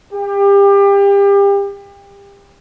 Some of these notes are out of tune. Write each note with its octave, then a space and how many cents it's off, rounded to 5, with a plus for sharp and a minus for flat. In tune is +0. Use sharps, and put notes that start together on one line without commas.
G4 +30